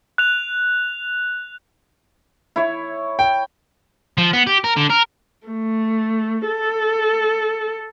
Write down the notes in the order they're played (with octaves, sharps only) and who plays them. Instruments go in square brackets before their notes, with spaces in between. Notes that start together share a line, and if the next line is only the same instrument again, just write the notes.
[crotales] F#6 F7
[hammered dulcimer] E4 C#5
[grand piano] G5
[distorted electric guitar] F3
B3
G4
A#4
D3
A#4
[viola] A3
A4